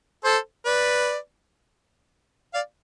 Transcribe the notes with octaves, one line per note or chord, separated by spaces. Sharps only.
A4 C5
B4 D5
D5 F5